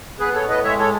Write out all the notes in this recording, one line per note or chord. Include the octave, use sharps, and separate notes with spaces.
B3 G#4 B4
A4 C#5
A2
B4 D#5
G#3 C#5 E5
A4 C#5